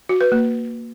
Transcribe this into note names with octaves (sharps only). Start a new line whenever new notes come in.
F#4
B4
A#3